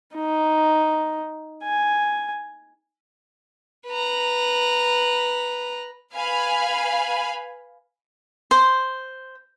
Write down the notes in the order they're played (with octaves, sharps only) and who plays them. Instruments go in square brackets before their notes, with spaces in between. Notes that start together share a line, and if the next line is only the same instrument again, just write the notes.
[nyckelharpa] D#4
G#5
[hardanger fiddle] B4 A#5
[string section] B4 F5 G#5 B5
[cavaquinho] C5